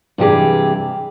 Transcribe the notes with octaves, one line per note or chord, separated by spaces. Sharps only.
G2 C3 E3 G4 G#4